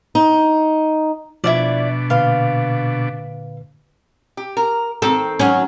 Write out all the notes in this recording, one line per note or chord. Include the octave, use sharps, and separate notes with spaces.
D#4
B2 F3 D4 E4 F4 D5
A#2 D3 B4 F5 C6
G4
A#4
D#3 C4 A4
F#3 C#4